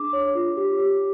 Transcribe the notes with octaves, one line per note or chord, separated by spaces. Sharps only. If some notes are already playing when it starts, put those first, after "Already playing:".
Already playing: D4 G#4 D6
C#5
F4
G4
G4